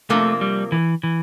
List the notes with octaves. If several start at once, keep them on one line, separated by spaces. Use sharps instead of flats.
C3 F3 A3 A#3 D4
G3
E3
E3